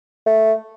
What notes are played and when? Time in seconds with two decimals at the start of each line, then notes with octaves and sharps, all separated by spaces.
0.26 A3